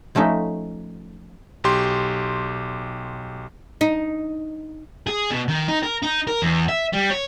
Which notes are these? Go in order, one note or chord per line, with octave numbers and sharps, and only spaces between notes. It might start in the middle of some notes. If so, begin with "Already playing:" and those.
F3 A3 C#4 D#4 E5
B1 G4 C6
D#4
G#4
B2
D#3
D#4
A#4
D#4
A#4
E2
E5
G3
C#5